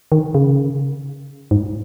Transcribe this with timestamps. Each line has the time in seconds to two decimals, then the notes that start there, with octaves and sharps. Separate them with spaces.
0.12 D#3
0.35 C#3
1.51 G#2